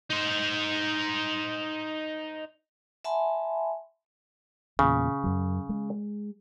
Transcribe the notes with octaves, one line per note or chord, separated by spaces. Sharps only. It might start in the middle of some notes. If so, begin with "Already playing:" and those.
D#4 C5
E5 F#5 G#5 A5 B5 C6
E2 A#2 C#3
F#2 F#3
G#3